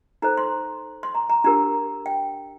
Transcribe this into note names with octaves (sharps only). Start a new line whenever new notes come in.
D#4 A4 C5 A#5
C6
C6
A#5
A#5
D4 G4 A#4 A#5
G5